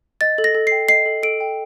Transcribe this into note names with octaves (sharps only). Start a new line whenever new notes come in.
D#5 A6
A4
A#6
A4
G5 C7
D#5 C7
A4
A4 D7
G5